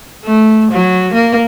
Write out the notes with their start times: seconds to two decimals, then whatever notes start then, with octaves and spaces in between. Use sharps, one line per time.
0.25 A3
0.72 F#3
1.14 A#3